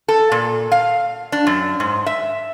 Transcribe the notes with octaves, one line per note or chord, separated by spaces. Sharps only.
A4
A#2
F5
D4
F#2
G#2
E5